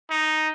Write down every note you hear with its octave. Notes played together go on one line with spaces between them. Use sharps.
D#4